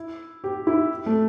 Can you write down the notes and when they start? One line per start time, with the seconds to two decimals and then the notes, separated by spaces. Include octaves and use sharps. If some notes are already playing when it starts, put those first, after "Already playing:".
Already playing: E4
0.44 G4
0.67 E4
1.06 A3